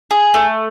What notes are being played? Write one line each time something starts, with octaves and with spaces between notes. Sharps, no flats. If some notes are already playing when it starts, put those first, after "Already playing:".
G#4
A3